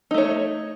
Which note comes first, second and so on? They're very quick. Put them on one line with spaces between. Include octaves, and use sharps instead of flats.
D#4 A3 C#5